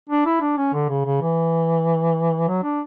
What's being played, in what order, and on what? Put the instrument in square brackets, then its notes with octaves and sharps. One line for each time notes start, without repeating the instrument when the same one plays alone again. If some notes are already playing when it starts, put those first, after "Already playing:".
[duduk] D4
E4
D4
C#4
D3
C#3
C#3
E3
F#3
D4